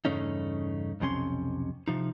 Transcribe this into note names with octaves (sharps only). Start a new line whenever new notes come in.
E2 G2 C#3 A3 C#4 D#4
B1 F2 C3 C#4 C6
C3 F3 D#4